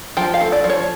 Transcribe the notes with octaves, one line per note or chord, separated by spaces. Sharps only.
F3 G5
F5
A3
D5
F3
C#5